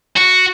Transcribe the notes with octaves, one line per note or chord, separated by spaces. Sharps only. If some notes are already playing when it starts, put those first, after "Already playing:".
F#4